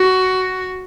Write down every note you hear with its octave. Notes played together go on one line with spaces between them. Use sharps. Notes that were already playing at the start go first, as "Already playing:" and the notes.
Already playing: F#4